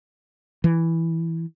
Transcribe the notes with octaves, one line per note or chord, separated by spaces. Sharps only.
E3